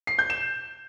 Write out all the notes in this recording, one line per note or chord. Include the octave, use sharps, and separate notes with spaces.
C7
G6
E7